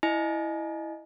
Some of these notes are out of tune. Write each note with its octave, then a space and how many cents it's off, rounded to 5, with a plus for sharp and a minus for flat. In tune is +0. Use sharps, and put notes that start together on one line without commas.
E4 +0 D#5 -20 G#5 +30